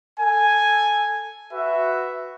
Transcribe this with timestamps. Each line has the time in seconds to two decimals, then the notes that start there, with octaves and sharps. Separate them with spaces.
0.20 A4 G#5
1.52 F#4 B4 E5